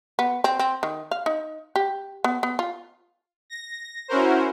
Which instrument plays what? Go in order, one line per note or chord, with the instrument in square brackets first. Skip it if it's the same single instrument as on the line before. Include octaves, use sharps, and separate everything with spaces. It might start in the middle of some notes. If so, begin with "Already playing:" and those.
[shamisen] B3
C4
C4
D#3
F5
D#4
G4
B3
B3
F4
[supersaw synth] A#6
C#4 E4 F#4 A#4 C5